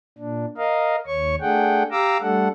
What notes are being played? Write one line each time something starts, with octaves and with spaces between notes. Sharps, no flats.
A#2 D4
A#4 D#5 F5
D#2 C#5 C#6
A3 D4 G#4 F#5 G5
G4 F5 A#5 D6 E6
G3 A3 D4 A4 F#5